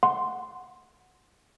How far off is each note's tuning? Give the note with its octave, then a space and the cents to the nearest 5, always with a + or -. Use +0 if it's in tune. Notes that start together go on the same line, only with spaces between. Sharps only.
F#5 -10 C6 +0